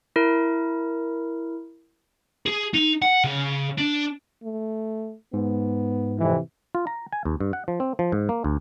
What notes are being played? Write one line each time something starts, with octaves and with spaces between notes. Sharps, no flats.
E4 A#4
G#4
D#4
F#5
C#3
D4
A3
G#2 B3
F2 C3 E3
F4
A#5
G#5
D#2
G2
F#5
F3
C4
F3
G#2
A#3
D2